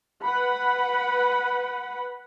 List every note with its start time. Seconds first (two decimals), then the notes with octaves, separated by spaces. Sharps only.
0.22 B4 F#5 B5